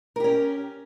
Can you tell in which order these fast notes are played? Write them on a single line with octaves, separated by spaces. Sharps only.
A#4 G4 C#4